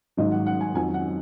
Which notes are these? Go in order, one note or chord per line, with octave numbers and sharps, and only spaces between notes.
G#1 G#2 D#3 F#3 D#5
F#5
F#5
G#5
F2 D#3 F#3 G#5
F#5